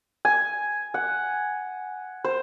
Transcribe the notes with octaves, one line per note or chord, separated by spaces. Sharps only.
G#5
F#5
C5